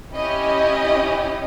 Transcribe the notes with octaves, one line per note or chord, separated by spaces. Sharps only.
C#4 E4 G4 D#5